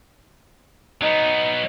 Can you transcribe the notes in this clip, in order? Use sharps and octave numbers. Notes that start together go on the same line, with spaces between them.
F#3 B3 D#4